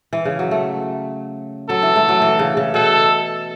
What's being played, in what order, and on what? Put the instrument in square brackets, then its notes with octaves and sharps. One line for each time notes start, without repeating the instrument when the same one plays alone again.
[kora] E3
C#3
F#3
A3
[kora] F#3 [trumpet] A4
[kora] E3
A3
F#3
E3
C#3
C#3
[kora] B2 [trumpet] A4